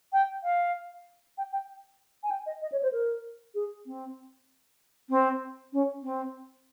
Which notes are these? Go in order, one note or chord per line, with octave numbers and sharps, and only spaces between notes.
G5
F5
G5
G5
G#5
G5
D#5
D#5
C#5
C5
A#4
G#4
C4
C4
C#4
C4